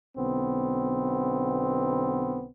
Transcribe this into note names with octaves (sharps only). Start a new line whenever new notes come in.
B1 D3 B3 C4